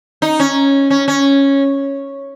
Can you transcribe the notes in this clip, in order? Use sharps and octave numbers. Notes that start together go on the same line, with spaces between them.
D#4
C#4
C#4
C#4